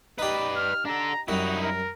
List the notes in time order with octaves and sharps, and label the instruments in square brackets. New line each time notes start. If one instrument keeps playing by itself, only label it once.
[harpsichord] D#4 G4 [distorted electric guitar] B4 D5
[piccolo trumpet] F6
[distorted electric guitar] D4 A4 [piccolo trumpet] A#5
[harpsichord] F#2 G3 [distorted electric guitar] D#4 E4 [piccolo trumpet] F#4
[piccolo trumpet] A#4